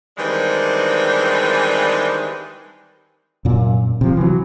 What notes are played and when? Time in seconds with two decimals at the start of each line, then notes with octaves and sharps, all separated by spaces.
0.18 D#3 E3 G3 G#3 C4 D4
3.45 F#2 A#2
4.01 C3 F3
4.17 E3 F#3